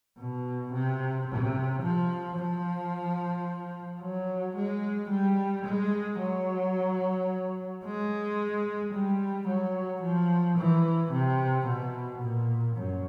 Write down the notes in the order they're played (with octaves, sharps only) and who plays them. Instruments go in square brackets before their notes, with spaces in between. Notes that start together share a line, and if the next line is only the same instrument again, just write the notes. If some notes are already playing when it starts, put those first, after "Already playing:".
[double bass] B2
C3
C3
F3
F3
F#3
G#3
G3
G#3
F#3
G#3
G3
F#3
F3
E3
C3
B2
A#2
F#2